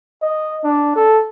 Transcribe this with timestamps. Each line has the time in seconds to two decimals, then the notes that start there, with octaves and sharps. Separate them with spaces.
0.22 D#5
0.64 D4
0.96 A4